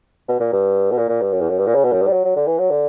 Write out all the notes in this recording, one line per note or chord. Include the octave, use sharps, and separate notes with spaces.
B2
A#2
G2
B2
A#2
A#2
G2
F#2
E2
F#2
G2
A#2
C#3
B2
F#2
G2
G3
F#3
F#3
D3
E3
F#3
D3